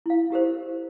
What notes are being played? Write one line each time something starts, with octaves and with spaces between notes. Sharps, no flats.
E4 F5
E4 G4 A#4 C5